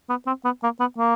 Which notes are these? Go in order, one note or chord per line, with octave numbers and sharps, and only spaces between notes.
B3
C4
B3
A#3
B3
A#3